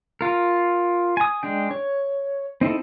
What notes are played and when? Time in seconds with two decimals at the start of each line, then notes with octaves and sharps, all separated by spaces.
0.21 F4 A#4
1.17 G#5 D#6
1.43 G#3 D4 G5
1.71 C#5
2.61 C4 D#4 E4 A4